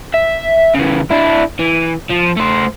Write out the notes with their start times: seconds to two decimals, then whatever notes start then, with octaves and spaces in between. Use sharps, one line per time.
0.14 E5
0.75 C#3 E3
1.10 D4 E4
1.59 E3
2.10 F3
2.37 A3 C5